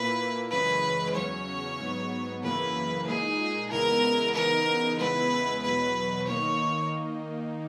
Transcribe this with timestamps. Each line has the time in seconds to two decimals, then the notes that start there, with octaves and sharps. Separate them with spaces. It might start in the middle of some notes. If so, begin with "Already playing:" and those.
Already playing: A#2 A#3 E4 B4
0.51 F#2 C#3 E3 G#3 C#4 B4
1.15 E2 C#3 F#3 C#4 C#5
1.79 G#2 F#3 B3
2.43 F#2 C#3 E3 A#3 E4 B4
3.06 A#2 G#3 D#4 G#4
3.71 E2 C#3 G#3 B3 E4 A#4
4.34 C#3 E3 B3 D#4 A#4
4.99 E2 C#3 G#3 B3 E4 B4
5.63 E2 B2 F#3 B4
6.27 D#3 A#3 D#4 C#5